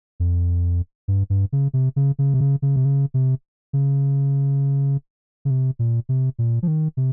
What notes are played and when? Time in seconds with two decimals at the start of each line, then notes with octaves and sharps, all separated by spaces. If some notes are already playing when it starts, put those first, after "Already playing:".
0.20 F2
1.08 G2
1.30 G2
1.52 C#3
1.73 C3
1.96 C#3
2.19 C#3
2.34 C3
2.40 C#3
2.62 C#3
2.76 C3
2.85 C#3
3.14 C3
3.73 C#3
5.45 C#3
5.50 C3
5.79 A#2
6.09 C3
6.39 A#2
6.63 F3
6.68 D#3
6.97 C3